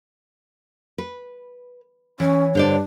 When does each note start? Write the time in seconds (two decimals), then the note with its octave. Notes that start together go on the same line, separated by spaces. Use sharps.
0.98 B4
2.20 E3 C#4 C#5
2.55 G2 D3 D4 C5 D5